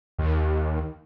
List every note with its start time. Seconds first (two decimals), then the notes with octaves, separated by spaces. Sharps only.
0.18 D#2